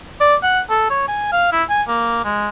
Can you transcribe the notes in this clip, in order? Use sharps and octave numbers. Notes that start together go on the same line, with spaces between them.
D5
F#5
A4
C#5
G#5
F5
E4
G#5
A#3
G#3